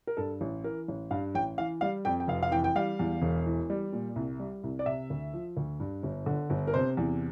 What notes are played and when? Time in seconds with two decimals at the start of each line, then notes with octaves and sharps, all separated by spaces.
0.07 A#4
0.17 G2 A4
0.41 A1
0.64 E3 A#4
0.88 A1
1.11 G2 F5
1.35 A1 G5
1.58 E3 F5
1.81 G3 F5
2.05 F2 G5
2.20 G5
2.28 F1 F5
2.43 F5
2.51 E3 G5
2.64 G5
2.75 G3 F5
2.99 E2
3.22 E1
3.46 E3
3.70 G3
3.93 A#2
4.16 C2
4.40 G3
4.63 C2
4.79 D5
4.86 C3 E5
5.10 D2
5.33 F3
5.57 D2
5.80 G2
6.03 G1
6.26 D3
6.50 G1
6.67 A#4
6.74 C3 C5
6.97 E2